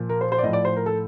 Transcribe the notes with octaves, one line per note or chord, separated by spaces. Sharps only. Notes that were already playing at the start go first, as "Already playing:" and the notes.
Already playing: A#2 F3
A#4
C5
C5
D5
A2 F3 D#5
D5
C5
A#4
A4